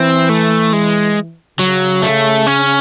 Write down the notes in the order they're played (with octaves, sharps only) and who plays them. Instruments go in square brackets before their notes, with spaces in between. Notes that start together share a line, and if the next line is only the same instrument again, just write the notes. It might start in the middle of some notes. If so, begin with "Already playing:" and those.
Already playing: [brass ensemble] E3 [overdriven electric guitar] C4
[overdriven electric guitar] A3
G#3
[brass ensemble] C#3 [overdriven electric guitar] F#3
[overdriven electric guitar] A3
C#4